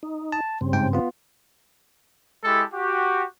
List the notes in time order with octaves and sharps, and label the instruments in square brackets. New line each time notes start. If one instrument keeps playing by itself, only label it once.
[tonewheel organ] D#4
[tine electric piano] A5
[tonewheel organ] G2 C#3 C4
[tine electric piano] G#2 G5
B3 F4
[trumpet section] G#3 E4 G4 A4
F#4 G4